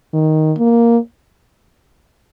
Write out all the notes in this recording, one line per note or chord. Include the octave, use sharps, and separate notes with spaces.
D#3
A#3